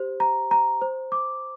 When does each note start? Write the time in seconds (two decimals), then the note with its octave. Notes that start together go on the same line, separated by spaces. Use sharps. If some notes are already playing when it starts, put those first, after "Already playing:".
Already playing: G4 C5
0.20 A#5
0.51 A#5
0.82 C5
1.12 D6